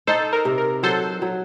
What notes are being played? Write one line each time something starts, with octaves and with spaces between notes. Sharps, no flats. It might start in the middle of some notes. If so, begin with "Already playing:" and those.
D#4 A4 C5
A#4
C3
A#4
F#3 A4 C5
F#3